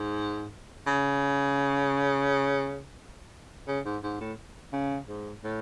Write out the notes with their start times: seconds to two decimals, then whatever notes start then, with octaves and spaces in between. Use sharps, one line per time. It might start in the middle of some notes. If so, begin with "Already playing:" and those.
Already playing: G#2
0.87 C#3
3.67 C#3
3.85 G#2
4.03 G#2
4.20 A2
4.72 C#3
5.08 G#2
5.44 A2